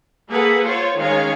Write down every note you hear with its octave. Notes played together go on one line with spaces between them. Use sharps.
A#3 G#4 A4 B4 F#5
F4 C5 C#5
D#3 G#3 C#4 C#5 F5